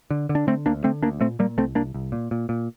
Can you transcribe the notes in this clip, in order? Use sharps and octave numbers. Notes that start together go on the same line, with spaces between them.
D3
D3
D4
D3 A3 C4
D2 A#3 D4
D3 A3 C4
D2 A#3 D4
A#2 A3 C4
A#2 G3 A#3
C2 A3 C4
C2 A#3 D4
C2
A#2
A#2
A#2